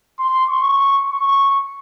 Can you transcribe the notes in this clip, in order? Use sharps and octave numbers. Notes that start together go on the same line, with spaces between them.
C6
C#6
C#6